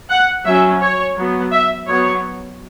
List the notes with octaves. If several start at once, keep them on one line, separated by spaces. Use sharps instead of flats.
F#5
F#3 C#4 E5
C#5
F#3 B3
E5
F#3 B3 C#5